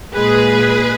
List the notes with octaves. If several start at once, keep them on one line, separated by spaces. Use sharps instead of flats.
A#2 G#3 G#4 B4